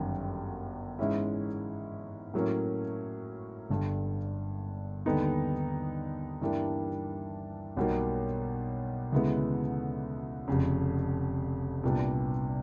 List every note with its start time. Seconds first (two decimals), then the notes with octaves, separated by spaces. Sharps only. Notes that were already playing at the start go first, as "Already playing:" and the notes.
Already playing: G1 F#2 D#3 G3
0.99 G#2 E3 G#3 C#4 E4
2.34 A2 F#3 A#3 C#4
3.70 G1 G2 D3
5.06 D#2 D3 G3 B3 D#4
6.42 G2 E3 G3 A#3 D4
7.77 B1 B2 G3 A#3 D#4
9.12 D2 C#3 E3 G#3 B3
10.48 F1 F2 C#3
11.83 C2 A#2 G3 B3 D4